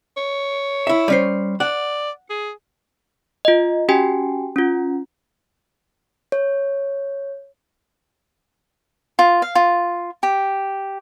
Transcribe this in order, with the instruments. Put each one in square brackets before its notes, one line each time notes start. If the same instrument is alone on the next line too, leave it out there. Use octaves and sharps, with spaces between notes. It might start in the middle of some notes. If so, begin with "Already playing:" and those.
[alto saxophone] C#5
[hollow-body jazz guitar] E4 E5
G3 C#4 C5
[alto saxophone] D5 [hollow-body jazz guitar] F#5
[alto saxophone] G#4
[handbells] F4 D#5
C#4 F#4 G4 G5 G#5
C#4 F4
[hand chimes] C#5
[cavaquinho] F4
F5
F4
G4